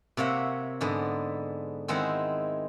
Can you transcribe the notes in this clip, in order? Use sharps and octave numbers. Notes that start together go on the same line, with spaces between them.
C3 A#3 C#5 E5 F#5
G#2 D3 G#3 B3
D#3 G#3 C4 E4 F#5